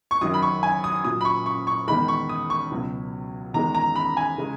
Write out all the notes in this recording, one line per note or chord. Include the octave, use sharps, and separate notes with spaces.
C#6
F#2 D#3 F#3 D#6
B5
C#6
G#5
D#6
A#2 F#3 D#6
B5
C#6
C#6
C#6
E2 D#3 G#3 B5
C#6
D#6
C#6
C#2 B2 F#3
E2 D#3 G#3 A#5
A#5
B5
G#5
C#3 G#3